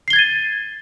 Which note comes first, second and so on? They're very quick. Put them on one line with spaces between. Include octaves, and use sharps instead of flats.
C7 G7 G#6 A6 D#7